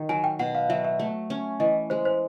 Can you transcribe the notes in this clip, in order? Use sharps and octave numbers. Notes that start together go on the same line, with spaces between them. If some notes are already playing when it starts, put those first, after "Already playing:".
Already playing: D#3
F#3 G#5
G5
B2 F#5
F5
F#3 E5
E5
A3
C#4
E3 D#5
G#3 C5
C5